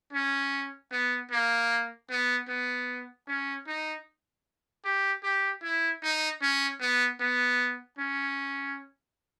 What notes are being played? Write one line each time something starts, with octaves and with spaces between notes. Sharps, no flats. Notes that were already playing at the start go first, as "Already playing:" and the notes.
C#4
B3
A#3
B3
B3
C#4
D#4
G4
G4
E4
D#4
C#4
B3
B3
C#4